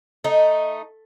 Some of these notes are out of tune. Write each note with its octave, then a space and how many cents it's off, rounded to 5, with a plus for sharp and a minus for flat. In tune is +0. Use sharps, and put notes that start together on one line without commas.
A3 +0 D#4 +0